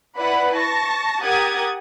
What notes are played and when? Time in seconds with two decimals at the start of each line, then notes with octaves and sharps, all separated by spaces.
0.18 E4 B4 D5 F#5 B5
0.56 A5 C#6 A#6
1.23 G4 A#4 F#5 D#6 G#6 A6